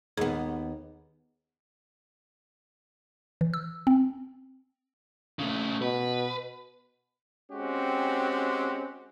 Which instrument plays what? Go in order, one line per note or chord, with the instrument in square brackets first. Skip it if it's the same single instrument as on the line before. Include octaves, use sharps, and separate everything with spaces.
[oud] D#2 B3 [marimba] G#4
[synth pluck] E3
E6
C4
[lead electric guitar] C#3 A3
[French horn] B2 [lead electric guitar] B4
[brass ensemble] G#3 C4 C#4 F#4 G4